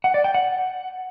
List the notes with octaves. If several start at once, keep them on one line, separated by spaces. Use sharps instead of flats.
F#5
D5
G5
F#5